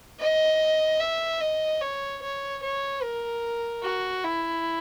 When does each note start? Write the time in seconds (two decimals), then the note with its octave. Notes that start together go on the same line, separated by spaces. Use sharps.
0.20 D#5
1.00 E5
1.41 D#5
1.81 C#5
2.22 C#5
2.62 C#5
3.03 A#4
3.83 F#4
4.24 E4